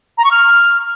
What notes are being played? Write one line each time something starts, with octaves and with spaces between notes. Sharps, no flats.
A#5
C#6
F6